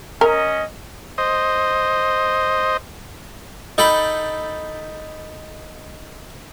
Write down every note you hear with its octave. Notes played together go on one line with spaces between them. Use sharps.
C#4 A#4 D#5
C5 D#5
D#4 A4 G5 B5